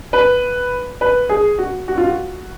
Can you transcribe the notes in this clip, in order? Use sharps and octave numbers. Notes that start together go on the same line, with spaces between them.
B4
B4
G#4
F#4
F#4
F4
F#4